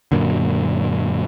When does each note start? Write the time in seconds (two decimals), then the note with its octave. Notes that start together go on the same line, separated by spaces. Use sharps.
0.12 F#2 A#2 D3